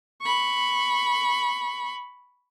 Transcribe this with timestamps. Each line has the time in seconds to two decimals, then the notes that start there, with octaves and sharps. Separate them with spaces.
0.22 B5 C#6